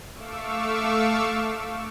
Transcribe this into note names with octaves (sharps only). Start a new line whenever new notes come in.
A3 F5 C#6 D6 E6